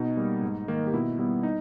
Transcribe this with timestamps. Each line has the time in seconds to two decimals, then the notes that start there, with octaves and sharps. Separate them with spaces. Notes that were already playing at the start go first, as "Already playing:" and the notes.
Already playing: B2 D#4
0.17 G3 A#3
0.42 G#2
0.68 D#3 A#3
0.87 G4
0.93 B2 E4
1.19 G3 B3 E4
1.43 D#4